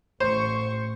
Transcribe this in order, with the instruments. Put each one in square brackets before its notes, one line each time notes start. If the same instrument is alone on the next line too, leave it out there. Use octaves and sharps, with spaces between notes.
[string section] A1 C#6 [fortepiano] C5